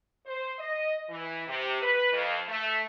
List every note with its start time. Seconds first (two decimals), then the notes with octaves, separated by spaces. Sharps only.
0.26 C5
0.59 D#5
1.09 E3
1.47 C3
1.82 B4
2.12 F2
2.48 A3